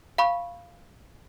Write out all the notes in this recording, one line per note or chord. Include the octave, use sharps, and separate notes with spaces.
F5 B5 C#6